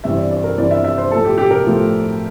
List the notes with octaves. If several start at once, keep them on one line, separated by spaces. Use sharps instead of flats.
G2 E3 G3 C4 E4 E5
D5
D5
A#4
G2 E3 G3 C4 E4 D5
E5
E5
C5
A2 F3 A3 A4
G4
G4
A#4
A2 F3 A3